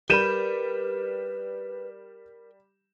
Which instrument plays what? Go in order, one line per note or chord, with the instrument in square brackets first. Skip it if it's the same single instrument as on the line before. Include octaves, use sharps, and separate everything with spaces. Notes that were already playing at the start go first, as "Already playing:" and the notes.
[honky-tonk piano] G3 [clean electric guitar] G4 A#4 B5 [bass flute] B4 [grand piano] G6 D#7 E7